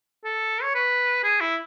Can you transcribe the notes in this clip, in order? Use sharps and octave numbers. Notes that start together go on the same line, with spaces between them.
A4
C#5
B4
G#4
E4